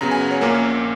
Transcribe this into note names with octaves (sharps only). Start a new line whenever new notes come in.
F#2 C#3 F#3 B3 A#5
G#5
F#5
C#5
A#1 A#2 A#3 C#4 A#4